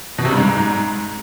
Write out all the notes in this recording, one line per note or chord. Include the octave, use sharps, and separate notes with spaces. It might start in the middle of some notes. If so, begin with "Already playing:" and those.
B2
C3
G2
G#2